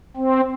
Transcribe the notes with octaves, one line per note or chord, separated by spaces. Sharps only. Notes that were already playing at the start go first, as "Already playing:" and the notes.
C4